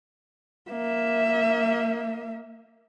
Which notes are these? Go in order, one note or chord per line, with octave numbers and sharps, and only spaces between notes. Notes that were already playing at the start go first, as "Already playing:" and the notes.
A#3 E5